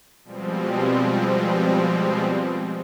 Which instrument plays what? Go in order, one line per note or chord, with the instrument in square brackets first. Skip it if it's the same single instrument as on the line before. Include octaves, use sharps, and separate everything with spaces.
[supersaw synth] B2 F3 G3 G#3 C4